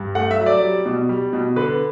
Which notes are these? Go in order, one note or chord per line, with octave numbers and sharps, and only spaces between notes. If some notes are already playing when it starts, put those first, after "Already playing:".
Already playing: G2
A3 F#5
E5
F#3
D5
G3
B2
G3
B2
D3 B4